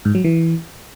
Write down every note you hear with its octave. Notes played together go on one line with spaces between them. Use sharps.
G#2
F#3
E3